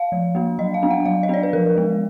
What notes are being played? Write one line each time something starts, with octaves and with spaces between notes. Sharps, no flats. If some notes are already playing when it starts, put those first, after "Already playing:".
Already playing: F5
F3
A#3 D4
F#3 D#5
F5
B3 D4
F#5
F#3 F5
D#5
B3 D4 D5
B4
F3 A#4
G#3 B3